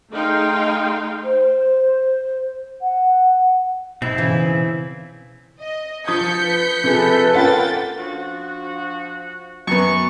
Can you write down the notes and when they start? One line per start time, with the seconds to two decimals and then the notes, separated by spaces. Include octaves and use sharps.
0.11 A3 D#4 G#4 F5 G5 C6
1.24 C5
2.81 F#5
4.02 B2 C4 D#4 E4
4.18 C#3 E3
5.60 D#5
6.07 F3 D#6 G6 G#6 B6 C#7
6.44 B4
6.84 C3 F3 G#4 A4 B4
7.33 A#3 C#4 F4 F#5 G5 A6
7.99 F3 D4 F#4
9.67 F#2 B3 C#6